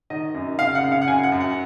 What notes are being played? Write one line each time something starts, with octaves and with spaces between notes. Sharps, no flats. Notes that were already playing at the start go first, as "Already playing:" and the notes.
D#3 D#5
F#2
C#3 F5
F#5
C#3
F5
F#5
F#2 G#5
F#5
F#2
F#5